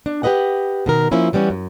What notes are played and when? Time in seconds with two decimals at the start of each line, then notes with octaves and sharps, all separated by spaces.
0.06 D4
0.23 G4 G#4 B4 D#5 F#5
0.86 B2 D#3 A#4
1.11 F3 A#3 C#4 E4 F4
1.33 E3 G3 B3 C#4
1.50 F#2